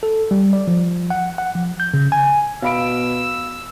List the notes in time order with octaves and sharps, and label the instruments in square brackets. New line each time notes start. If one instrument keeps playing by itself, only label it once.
[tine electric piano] A4
G3
D5
F3
F#5
F#5
F3
G6
C#3
G#5
[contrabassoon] B2 [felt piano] F5 B5 D7 [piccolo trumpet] E6